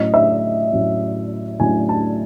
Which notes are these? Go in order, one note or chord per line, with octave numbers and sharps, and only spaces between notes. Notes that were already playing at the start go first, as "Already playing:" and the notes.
Already playing: A2 F#3 C#4 D#5
E5
A2 F#3 C#4
A2 F#3 C#4 G#5
A5